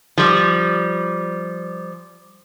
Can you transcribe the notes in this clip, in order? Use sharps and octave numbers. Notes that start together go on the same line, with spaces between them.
F3 G3